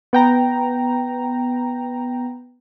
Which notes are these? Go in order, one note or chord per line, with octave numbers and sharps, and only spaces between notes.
B3 G5 A#5